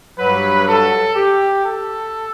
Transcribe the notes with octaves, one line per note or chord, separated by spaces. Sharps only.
G2 F#3 B4
A4
G4
A4